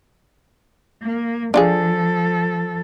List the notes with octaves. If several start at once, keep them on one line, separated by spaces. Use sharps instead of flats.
A#3
F3 D4 F4 G#4 A4